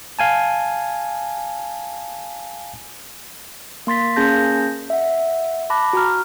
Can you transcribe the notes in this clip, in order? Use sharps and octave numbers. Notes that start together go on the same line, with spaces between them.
F5 G#5 A5
A#3 C6 A6 B6
A#3 C#4 G#4 A5 G6 A#6
E5 F#5
A5 B5 D6 F#6 A#6
F#4 A#5 F6